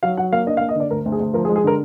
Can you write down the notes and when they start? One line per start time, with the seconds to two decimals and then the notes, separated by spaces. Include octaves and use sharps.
0.03 F#3 F5
0.17 F#3 F#5
0.32 A#3 F5
0.47 D4 D#5
0.57 F5
0.61 A#3
0.69 D#5
0.75 D3 D5
0.91 D2 A#4
1.06 D2
1.12 G#4
1.20 D2
1.34 F3 A#4
1.45 G#4
1.49 G#3
1.56 G#4
1.64 D3 A#4